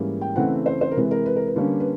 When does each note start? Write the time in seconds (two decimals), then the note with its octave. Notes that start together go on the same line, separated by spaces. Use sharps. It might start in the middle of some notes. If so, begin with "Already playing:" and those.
Already playing: G#2 E3 G3 A#3 C#4
0.21 G5
0.36 C#3 E3 A3 C4 F#5
0.66 C5
0.81 C5
0.91 A#4
0.95 C3 E3 G#3 B4
1.11 A#4
1.26 B4
1.36 A#4
1.47 B4
1.56 D3 G3 A#3 C#4
1.80 B4